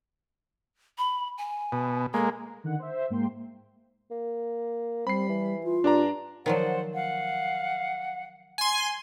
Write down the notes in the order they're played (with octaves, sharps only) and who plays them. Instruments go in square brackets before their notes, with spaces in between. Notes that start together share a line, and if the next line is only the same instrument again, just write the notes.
[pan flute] B5
G#5
[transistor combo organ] B2
[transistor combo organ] G#3 A#3 [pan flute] A4
[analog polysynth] D3 D#3 F#5
C5 E5
G#2 A#3 G5 C6
[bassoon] A#3
[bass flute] G3 [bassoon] C4 [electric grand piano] B5 C7
[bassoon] E3
[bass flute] F4
[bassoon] G2 [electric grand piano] D4 D5 A#5
[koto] D#3 F3 F#3 [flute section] C5 D5 F#5
[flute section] F5 F#5
[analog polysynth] G#5 C6